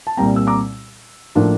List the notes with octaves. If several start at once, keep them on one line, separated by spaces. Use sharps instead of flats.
A5
C2 A#2 G3 C4 G5 A#5
E6
A#5 D6
A2 F3 A#3 D4